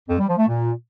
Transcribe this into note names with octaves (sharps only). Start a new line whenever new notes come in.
F2
G3
F3
A3
A#2